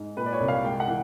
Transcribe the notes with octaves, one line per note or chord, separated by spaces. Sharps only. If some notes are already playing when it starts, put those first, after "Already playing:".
Already playing: G#2
A#2 B4
D5
C#5
C2
F5
G#3 G5
F#5
E3